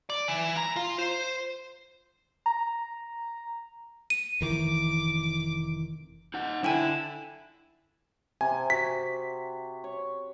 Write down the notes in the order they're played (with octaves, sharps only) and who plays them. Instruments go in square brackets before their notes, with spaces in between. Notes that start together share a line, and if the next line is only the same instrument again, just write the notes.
[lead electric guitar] D5
E3
A#5
F4
C5
[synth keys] A#5
[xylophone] D#7
[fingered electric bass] F1 D#3 E3 [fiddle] D6
[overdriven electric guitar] D#4 F#5
[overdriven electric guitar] D3 [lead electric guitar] E4 [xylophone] G5 G#5
[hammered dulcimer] C3 [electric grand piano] G#5
[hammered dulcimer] F#4 [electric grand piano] B6
[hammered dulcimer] C#5